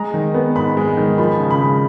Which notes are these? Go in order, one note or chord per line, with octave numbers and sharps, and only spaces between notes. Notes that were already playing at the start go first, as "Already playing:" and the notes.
Already playing: G#3 A#5
D#3
B3
G#2 B5
G#3
D#3
F3 B5
C#3
B5
G#3